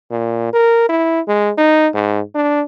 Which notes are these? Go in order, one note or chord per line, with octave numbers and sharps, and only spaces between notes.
A#2
A#4
E4
G#3
D#4
G#2
D4